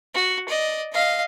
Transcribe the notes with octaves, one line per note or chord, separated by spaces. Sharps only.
F#4
D5 D#5
D#5 F5